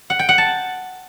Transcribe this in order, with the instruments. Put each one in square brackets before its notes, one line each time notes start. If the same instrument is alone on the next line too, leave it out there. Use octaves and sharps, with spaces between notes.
[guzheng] F#5
G5
F#5
A5